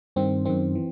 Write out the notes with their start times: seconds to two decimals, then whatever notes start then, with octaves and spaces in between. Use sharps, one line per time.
0.16 G2 D#3 C4
0.45 F#2 D#3 C4
0.75 E3